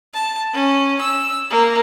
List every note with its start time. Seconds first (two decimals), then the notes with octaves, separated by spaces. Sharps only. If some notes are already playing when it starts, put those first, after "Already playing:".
0.14 A5
0.54 C#4
1.01 E6
1.50 A#3